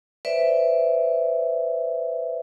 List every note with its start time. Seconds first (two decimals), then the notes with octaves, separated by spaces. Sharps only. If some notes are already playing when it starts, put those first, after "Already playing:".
0.25 B4 C5 D5 E5